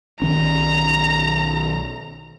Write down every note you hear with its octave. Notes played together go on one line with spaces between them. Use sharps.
B1 D#3 C#4 A#5